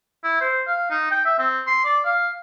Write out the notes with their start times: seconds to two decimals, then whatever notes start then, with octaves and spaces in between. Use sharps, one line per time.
0.24 E4
0.41 C5
0.67 F5
0.90 D#4
1.11 G5
1.25 E5
1.39 C4
1.67 C6
1.84 D5
2.05 F5